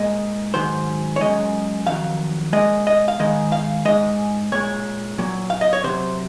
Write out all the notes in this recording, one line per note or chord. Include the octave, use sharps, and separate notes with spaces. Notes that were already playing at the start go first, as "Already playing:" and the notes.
Already playing: A#2 G#3 D#5
G#2 D#3 F#3 C5
C#5
F#2 F3 G#3 D#5
F2 D#3 F#3 F5
A#2 G#3 D#5
D#5
F5
G#2 D#3 G#3 D#5
F5
G#2 D#3 G#3 D#5
A#2 G#3 C#5
A#2 F#3
F5
D#5
C#5
C3 F#3 C5